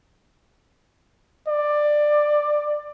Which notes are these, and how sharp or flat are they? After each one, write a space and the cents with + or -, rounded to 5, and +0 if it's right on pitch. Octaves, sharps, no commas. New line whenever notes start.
D5 +15